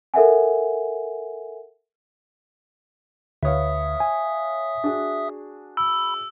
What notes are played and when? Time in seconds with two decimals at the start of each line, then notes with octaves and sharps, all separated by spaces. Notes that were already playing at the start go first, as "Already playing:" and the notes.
0.14 A4 A#4 E5 F#5 G#5
3.43 D2 B4 C#5 E5 F5 D#6
4.00 G#5
4.84 D4 F#4 G#4
5.77 B5 E6